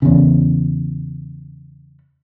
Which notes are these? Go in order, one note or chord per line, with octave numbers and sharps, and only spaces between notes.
E2 C#3